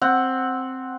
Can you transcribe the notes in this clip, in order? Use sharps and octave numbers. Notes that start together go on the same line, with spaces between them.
C4 F#5